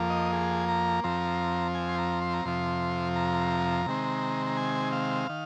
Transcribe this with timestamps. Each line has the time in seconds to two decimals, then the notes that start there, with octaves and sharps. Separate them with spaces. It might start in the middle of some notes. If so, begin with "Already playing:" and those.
Already playing: F2 F3 A#3
0.10 D#5
0.33 G#4
0.68 A#5
1.04 F2 F3 C4 A#5
1.74 G#5
1.89 C6
1.98 A#5
2.22 C6
2.33 A#5
2.45 F2 C3 F3 C6
3.16 A#5
3.86 C3 D#3 G#3 C4
4.46 A#5
4.57 G#5
4.92 F5
5.29 D#3